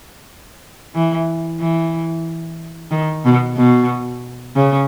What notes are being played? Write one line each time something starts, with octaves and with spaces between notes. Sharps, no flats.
E3
E3
D#3
B2
B2
C#3